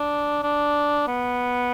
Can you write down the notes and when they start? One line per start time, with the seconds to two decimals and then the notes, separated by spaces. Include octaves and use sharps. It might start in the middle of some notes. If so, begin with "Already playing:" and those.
Already playing: D4
0.43 D4
1.07 B3